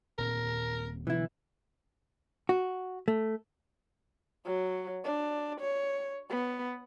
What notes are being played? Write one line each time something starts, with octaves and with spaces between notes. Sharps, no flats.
D#1 A#2 C4 A#4
B2 D3 E3 F#3 E4
F#4
A3
F#3
D4
C#5
B3